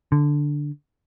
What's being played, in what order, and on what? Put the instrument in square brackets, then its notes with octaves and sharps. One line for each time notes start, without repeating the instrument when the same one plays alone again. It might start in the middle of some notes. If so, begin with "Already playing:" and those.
[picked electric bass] D3